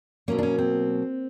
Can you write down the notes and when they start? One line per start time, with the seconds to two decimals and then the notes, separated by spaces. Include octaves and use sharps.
0.28 B2 F#3 A#3 C#4
0.38 D4
0.43 C#4
0.58 C4